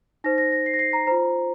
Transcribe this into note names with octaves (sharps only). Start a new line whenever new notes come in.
D#4 C5 A#6
A#6
A#6
C7
A#6
C7
A#5
F4 C5 A#5